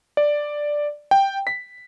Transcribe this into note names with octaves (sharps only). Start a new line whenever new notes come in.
D5
G5
B6